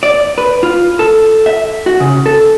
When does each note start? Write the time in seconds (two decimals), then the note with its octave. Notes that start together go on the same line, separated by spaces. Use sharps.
0.03 D5
0.38 B4
0.63 F4
0.99 A4
1.46 E5
1.86 F#4
2.00 C#3
2.26 A4